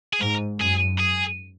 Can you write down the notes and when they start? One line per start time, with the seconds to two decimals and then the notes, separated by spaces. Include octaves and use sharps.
0.13 G#4
0.21 G#2 A#4
0.60 F#2 G#4
0.99 G#4